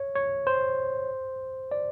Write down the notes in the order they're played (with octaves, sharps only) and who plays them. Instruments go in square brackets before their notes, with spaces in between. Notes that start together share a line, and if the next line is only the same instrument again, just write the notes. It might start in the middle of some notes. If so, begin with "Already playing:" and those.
Already playing: [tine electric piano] C#5
C#5
C5
D5